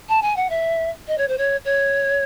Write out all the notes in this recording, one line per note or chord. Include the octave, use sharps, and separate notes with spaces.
A5
G#5
F#5
E5
D#5
C#5
C5
C#5
C#5